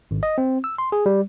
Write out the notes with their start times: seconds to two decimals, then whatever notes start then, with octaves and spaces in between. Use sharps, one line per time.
0.11 G#1
0.23 D#5
0.38 C4
0.64 E6
0.78 C6
0.92 G#4
1.06 G3